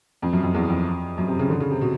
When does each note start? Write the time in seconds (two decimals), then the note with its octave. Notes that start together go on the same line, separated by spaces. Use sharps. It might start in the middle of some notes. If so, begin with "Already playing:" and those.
0.22 F2
0.33 F#2
0.43 F2
0.54 E2
0.70 F2
1.18 F#2
1.28 C3
1.39 C#3
1.50 D3
1.60 C#3
1.71 C3
1.81 B2